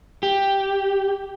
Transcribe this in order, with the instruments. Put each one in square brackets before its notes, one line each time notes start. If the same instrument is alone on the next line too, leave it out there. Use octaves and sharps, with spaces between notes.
[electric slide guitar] G4